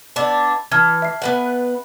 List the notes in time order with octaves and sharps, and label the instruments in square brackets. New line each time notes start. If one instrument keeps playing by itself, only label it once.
[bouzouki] B3 D4 E4
[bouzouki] E3 [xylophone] A5 F6 G#6
[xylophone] E5 C7
[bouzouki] B3 B4 F#5